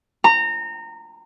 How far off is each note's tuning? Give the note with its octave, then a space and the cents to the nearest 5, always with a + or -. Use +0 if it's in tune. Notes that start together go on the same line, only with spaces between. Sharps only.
A#5 -25